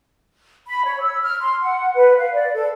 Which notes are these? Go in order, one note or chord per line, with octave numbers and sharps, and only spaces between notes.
B5
C#5
E6
F6
C6
F#5
B4
F5
D5
A4